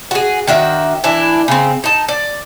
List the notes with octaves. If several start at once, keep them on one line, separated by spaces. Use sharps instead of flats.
F#4 G#4
D#3 D4 F#4 E5
E3 D4 E4
C#3 C4
D#4 A5
D5